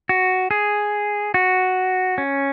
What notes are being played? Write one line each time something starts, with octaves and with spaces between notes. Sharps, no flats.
F#4
G#4
F#4
C#4